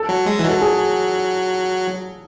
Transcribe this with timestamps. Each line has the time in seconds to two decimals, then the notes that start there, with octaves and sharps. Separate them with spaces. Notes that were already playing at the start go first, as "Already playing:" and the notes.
Already playing: A4
0.09 F#3
0.26 G#3
0.39 E3
0.44 F#3
0.49 A4
0.62 G#4